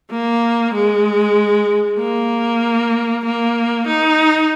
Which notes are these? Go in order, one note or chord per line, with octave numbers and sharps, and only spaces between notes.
A#3
G#3
A#3
A#3
D#4